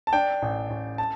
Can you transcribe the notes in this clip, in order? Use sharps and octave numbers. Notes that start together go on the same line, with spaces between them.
A5
D4 G5
A1
A1
A5